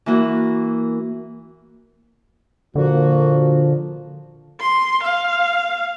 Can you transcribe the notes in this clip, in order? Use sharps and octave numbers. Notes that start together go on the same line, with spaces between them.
E3 A#3 F#4
A#2 D3 F3 A#3 F#4
C6
F5